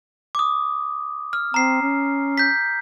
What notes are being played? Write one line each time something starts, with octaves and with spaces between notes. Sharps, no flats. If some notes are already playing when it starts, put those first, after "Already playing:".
D6 D#6
F6
C4 A#5 C7
C#4
G6 B6